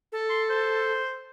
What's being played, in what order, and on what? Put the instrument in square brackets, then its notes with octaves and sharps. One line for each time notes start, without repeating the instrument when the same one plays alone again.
[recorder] A4
[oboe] C6
C5